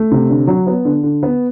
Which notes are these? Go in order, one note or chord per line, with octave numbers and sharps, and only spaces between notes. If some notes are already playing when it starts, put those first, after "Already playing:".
Already playing: A3
C3
D3
F#3
B3
D3
D3
B3